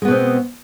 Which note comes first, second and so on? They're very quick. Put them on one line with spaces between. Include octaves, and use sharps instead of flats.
G#3 B3 B2 C4